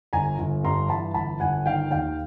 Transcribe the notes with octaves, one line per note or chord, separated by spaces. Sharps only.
G1 G#5 A#5
G1
G2 A#5 C6
E3 A5 B5
G1 A5 B5
G1 F#5 G#5
D#3 F5 G5
D#2 F5 G5